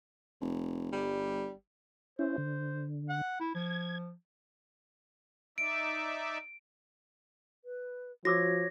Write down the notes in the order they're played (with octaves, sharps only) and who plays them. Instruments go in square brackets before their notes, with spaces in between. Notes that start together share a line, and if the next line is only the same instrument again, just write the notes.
[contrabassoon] F1
[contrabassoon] G1 [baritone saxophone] G3
[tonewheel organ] C#4 E4 [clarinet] C5
[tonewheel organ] D3
[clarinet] F#5
E4
[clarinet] F3 [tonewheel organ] G#6
[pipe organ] D#4 D5 E5 [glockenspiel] D7
[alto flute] B4
[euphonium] F3 [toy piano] F#4 D6 E6 [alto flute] C#5 [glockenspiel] A#6